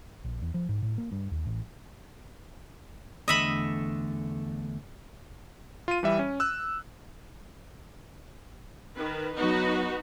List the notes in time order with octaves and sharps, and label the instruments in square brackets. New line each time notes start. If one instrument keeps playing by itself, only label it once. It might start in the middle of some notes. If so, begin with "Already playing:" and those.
[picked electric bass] A#1
E2
F3
G#2
A2
A#3
G2
D#2
A1
[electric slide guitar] E2 D3 A3 [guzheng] D#5 E5 B5
[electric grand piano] F4 D#7
E3 G3 E5
C#4
E6 F#6
[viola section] D#3 B4
[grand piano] F#3 B3 [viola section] D#4 F#4 B4